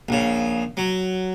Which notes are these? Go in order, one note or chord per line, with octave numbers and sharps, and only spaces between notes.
A#1 C#3
F#3